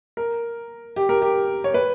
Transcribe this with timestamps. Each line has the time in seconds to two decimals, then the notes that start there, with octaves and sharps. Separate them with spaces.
0.17 A#4
0.96 G4
1.09 A#4
1.22 G4
1.64 C#5
1.74 B4